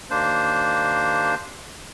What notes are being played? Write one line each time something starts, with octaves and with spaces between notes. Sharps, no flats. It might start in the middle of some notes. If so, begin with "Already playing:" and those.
D#2 A#3 D4 C5